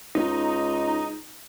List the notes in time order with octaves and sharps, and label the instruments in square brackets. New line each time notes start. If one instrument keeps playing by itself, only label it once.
[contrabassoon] C#2 [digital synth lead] D#4